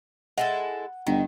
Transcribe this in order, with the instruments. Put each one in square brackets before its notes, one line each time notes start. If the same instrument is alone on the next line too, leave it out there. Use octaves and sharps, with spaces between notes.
[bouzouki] G#3 E4 A4 [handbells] F#5
[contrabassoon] G1 [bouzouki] D#3